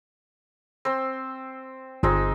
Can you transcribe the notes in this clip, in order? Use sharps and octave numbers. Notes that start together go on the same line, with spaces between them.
C4 C5 C6
G1 G#3 C4 D#4